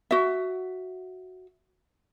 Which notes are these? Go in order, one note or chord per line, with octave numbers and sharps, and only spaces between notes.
F#4 E5